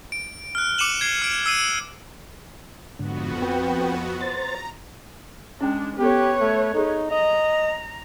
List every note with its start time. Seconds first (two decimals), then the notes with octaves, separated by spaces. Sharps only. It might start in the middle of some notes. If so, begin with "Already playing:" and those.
0.12 D7
0.55 F6 F#6
0.78 D6 C#7 D#7 E7 F#7
1.01 G#6 C7
1.22 F6 D7
1.46 E6 C7 D#7
2.99 F2 G#2 D3 B3 F#4
3.42 C4 B4 G5
4.21 C5 A#5 A6
5.61 G#3 C#4 D4 G5
5.98 B3 G4 A4 B4 C#5
6.40 A3
6.74 D#4 G#4 A4
7.11 D#5 A#5